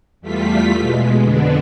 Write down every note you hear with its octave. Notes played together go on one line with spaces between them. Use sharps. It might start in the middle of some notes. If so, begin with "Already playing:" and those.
E2 G3 A3 F4 B6
B2 G#3
F2 D3 G#3 B3 D4